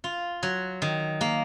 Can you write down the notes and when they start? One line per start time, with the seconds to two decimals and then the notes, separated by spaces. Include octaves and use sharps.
0.04 F4
0.43 F#3
0.82 D#3
1.21 A#3